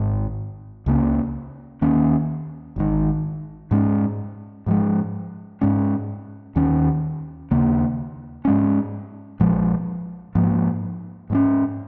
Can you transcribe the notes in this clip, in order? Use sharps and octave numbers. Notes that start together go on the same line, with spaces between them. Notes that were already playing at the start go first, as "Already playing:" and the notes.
Already playing: G#1 G#2
C#2 C#3 A#3 C#4
D#2 D#3 A#3 C#4
G#1 G#2 D#3
G#2 G#3 C#4
G#2 F3 G#3
G#2 G#3 C#4
D#2 D#3 C#4
D#2 C#3 A#3
G#2 G#3 C#4
A#1 A#2 F3 G#3
G#2 F3 A#3
G#2 G#3 C#4